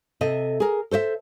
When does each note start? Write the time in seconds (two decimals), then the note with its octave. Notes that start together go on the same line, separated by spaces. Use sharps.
0.21 C3 A4 D#5 E5
0.60 G#4 A#4
0.91 A4 C5 C#5 E5